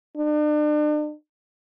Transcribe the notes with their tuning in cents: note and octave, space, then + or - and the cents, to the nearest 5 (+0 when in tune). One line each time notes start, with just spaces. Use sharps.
D4 +40